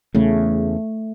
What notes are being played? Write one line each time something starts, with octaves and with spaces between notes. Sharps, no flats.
E2 C#3 A3